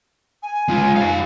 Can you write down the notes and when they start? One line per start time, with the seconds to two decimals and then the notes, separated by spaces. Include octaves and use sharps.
0.42 G#5
0.68 G#3 F4
0.96 G4 F5